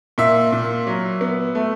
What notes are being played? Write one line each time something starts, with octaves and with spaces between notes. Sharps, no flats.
A#2 E5
A#2
F#3
B3
A3